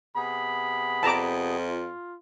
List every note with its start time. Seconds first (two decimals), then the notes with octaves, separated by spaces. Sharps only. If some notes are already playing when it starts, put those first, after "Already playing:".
0.16 C3 B3 G#4 B5
1.03 F2 A5 A#5 D6
1.58 F4